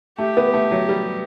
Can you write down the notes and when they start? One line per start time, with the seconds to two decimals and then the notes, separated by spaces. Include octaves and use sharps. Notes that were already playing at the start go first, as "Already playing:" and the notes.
0.18 A3 G4
0.37 B3
0.54 A3
0.71 F#3
0.89 G3